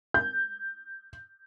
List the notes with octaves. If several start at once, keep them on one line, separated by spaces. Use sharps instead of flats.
G6